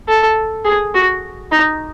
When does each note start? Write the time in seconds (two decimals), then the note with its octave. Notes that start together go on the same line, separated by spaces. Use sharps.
0.09 A4
0.65 G#4
0.95 F#4
1.52 D#4